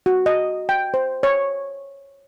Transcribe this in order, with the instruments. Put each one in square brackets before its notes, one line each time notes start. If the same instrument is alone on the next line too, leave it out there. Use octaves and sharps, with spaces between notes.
[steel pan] F#4
D#5
G5
C5
C#5